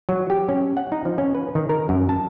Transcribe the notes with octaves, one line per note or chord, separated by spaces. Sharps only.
F#3
G4
C#4
F#5
D#4
F3
C#4
B4
D#3
A#4
F#2
A5